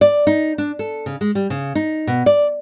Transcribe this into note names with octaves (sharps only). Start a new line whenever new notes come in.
D5
D#4
D4
A4
C#3
G#3
G3
C#3
D#4
B2
D5